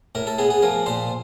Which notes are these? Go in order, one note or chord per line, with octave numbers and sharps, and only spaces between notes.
A2 A#4
A4
B3 G#4
G#4
F3 A#4
A#2 C5